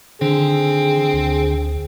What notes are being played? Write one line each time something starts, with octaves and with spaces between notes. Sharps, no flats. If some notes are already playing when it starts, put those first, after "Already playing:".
D3 D#3 C4 G#4
D2